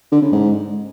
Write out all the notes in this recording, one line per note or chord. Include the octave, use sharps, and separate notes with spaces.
D3
C#3
G#2